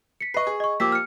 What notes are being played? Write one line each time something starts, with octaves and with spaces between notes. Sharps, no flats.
B6 C#7
B4 D#5 C#6 C7
G#4
D#5 C#6
F3 A#3 G4 D6 E6 B6
F6 C#7